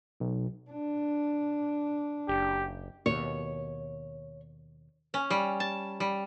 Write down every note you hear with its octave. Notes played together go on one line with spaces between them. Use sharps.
B1
D4
F#1 G4
D#2 B2 C#5
C#4
G3
A5
G3